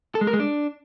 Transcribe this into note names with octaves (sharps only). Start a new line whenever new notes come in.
A4
G#3
A#4
G#3
D4